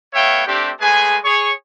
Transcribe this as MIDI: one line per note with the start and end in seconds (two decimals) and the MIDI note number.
0.14 0.45 57
0.14 0.45 59
0.14 0.45 73
0.14 0.45 76
0.14 0.45 77
0.14 0.45 79
0.46 0.71 57
0.46 0.71 60
0.46 0.71 62
0.46 0.71 67
0.80 1.18 56
0.80 1.18 57
0.80 1.18 68
0.80 1.18 71
0.80 1.18 80
1.24 1.52 68
1.24 1.52 73
1.24 1.52 85